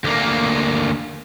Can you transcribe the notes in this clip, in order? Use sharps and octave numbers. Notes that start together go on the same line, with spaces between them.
D2 A#3